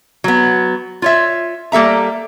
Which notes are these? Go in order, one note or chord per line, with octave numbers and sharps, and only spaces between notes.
F#3 B3
F4 C#5 E5
G3 A#3 A4 E5 A#5